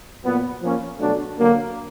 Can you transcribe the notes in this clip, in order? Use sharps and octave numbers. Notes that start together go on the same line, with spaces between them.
A#2 F#3 B3
F3 A#3 C#4
B2 F#3 A3 D4
D3 F#3 A#3